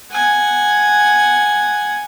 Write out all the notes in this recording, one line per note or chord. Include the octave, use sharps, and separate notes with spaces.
F#5 G#5